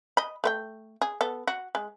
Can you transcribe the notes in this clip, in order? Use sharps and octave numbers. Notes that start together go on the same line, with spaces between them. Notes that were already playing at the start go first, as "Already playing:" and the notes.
D#5 B5
A3 B4 G5
G#4
B3 A4
F#4
G#3